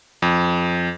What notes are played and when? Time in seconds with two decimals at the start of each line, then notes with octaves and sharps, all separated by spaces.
0.22 F2